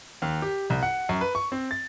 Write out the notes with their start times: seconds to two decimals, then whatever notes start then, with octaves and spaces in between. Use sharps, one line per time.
0.22 D#2
0.42 G4
0.70 C2
0.83 F#5
1.09 F#2
1.21 B4
1.35 C#6
1.52 C4
1.71 A6